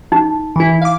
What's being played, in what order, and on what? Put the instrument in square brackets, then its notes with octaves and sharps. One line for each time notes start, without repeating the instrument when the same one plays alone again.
[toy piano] D#4
[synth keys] E3 E4
F5 D6